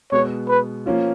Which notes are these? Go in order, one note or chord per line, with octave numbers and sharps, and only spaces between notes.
B2 G#3 B3 C#5
B4
F3 A#3 C#4 F4